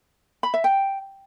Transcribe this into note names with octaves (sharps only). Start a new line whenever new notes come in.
B5
E5
G5